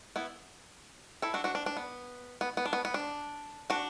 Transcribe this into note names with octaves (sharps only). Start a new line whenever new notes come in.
B3 E4
E4 A4
D4 F#4
D4 F#4
D4
D4
B3
B3
B3
D4
B3
B3
D4
D4 F#4